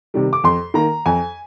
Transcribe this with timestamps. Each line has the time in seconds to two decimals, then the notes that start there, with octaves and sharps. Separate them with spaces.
0.14 C3 D#3 G3
0.33 D6
0.44 F2 C6
0.74 D#3 A#3 A#5
1.06 F2 G#5